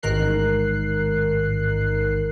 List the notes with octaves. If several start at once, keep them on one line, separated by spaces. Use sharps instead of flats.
A1 G#2 D#3 A#4 F#6 C7